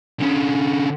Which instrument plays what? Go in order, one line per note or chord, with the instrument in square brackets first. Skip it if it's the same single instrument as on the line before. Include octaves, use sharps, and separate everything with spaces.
[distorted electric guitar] D3 C#4